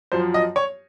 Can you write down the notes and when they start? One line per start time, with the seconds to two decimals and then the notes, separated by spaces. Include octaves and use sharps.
0.12 F#2 F3 C5
0.34 D#5
0.56 C#5